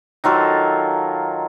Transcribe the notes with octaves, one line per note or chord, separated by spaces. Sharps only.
D#3 F#3 F4 A4